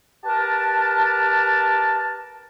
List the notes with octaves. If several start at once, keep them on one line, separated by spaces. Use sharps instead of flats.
G4 A#4 B4 A5